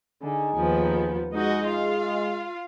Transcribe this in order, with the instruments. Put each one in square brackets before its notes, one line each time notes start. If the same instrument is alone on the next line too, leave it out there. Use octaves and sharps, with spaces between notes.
[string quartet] D3 [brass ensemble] D#4 G#4 G#5
[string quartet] D#2 F3 B3
[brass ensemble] G#3 [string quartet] D#4 F#4 D#5
[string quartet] F4 F5